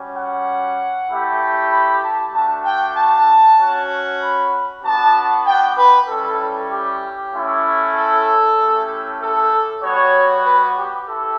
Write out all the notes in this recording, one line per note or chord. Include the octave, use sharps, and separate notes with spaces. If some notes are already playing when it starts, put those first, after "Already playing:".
Already playing: G3 C#4 F#4
F#5
A3 E4 G4
B5
A5
A3 D4 F#4 A5
G5
A5
C#4 F#4
B5
B3 D4 F#4 A5
G5
B4
G3 C#4 E4 A4
G4
A3 C#4 E4
A4
A3 C#4 E4 G4
A4
G3 B3 F#4 C#5
B4
G4
E4 G4 A4